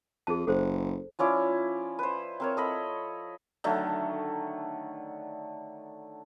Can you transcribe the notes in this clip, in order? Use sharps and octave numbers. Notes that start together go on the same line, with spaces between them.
F2 G#4 A5
F#1 A4 C5
F3 C#4 E4 D5
B4 C5
C4 A#4 C#5
A4 D#5 B5
D3 D#3 F#3 A3